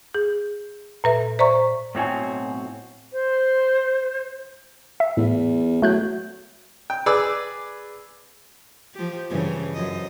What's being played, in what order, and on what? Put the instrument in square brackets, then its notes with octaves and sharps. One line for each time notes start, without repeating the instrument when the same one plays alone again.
[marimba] G#4
A#2 B4 E5
C5 D5 E5 A#5 C#6
[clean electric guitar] B1 C#5 G#5 [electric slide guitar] A2 C4 F#4
[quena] C5
[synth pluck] E5
[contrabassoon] E2 [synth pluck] A2
[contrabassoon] F#3 [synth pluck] A3 F#6 G6
[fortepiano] G5
G#4 B4 D5 E6
[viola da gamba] F3 G4
G2 C#3 E3
F#2 F3 D#5